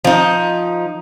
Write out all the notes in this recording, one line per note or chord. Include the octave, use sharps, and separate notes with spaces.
F3 D#4